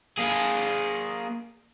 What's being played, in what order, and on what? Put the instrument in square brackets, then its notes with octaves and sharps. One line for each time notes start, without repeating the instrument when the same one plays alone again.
[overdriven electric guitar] A#3 G#4